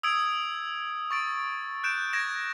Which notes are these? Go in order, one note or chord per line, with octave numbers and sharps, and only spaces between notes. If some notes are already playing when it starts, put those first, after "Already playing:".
D#6 E6 G#6 D7
C#6 A6 D7
F#6 G6 D7 E7
G#6 A#6 D7 E7